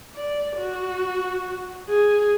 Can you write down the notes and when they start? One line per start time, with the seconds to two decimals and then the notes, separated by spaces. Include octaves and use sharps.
0.15 D5
0.56 F#4
1.89 G#4